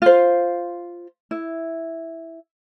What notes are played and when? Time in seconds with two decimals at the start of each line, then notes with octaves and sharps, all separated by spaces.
0.02 F4 C5
1.31 E4